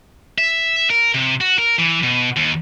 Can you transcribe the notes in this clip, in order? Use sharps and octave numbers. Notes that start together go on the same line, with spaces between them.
E5
A#4
C3
F#4
A#4
E3
B2
D#2